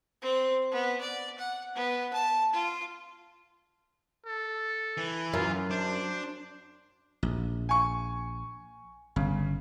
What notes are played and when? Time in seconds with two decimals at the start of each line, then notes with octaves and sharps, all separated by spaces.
0.22 C4
0.71 B3
1.00 D5
1.38 F#5
1.75 B3
2.13 A5
2.53 F4
4.26 A4
4.97 E3
5.33 F#2 F4
5.71 D4 C5
7.23 A#1
7.69 G#5 C#6
9.16 G1 C#3